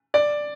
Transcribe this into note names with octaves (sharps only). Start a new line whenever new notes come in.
D5